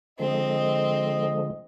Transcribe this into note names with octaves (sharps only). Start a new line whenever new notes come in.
D3 F3 G#3 C4 D#5